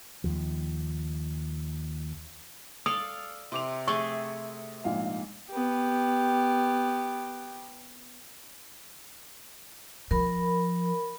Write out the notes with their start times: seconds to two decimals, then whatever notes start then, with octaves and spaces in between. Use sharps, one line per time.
0.24 D#2 F3
2.86 A4 D5 F5 D#6
3.52 C3 C6 D6 F7
3.88 A3 G#4 A4 C#6
4.84 A#1 G#2 F5
5.51 B3 G4
10.11 F3 A#4 B5